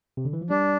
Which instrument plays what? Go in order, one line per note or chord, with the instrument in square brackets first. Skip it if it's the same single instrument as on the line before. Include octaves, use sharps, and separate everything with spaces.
[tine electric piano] C3
D3
E3
F3
[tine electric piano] G3 [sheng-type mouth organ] D4